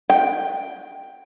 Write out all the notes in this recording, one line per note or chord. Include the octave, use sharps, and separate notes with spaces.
G5